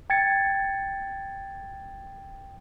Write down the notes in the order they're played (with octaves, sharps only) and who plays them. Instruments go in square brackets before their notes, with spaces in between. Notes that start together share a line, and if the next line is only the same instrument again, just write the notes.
[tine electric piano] G5 G#6 A6 C#7